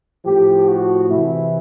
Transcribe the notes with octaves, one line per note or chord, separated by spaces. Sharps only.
A2 F3 G4
F#4
C3 E3 E4